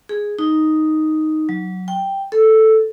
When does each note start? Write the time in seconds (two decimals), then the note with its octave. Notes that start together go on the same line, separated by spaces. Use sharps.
0.09 G#4
0.39 D#4
1.49 F#3
1.88 G5
2.32 A4